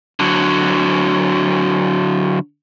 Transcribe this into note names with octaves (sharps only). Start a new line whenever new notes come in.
D3 F#3